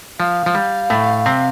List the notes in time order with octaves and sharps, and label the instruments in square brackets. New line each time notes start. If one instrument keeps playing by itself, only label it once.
[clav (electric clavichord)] F3 [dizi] F5
[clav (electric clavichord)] F3
G3
A2 A3
C3 C4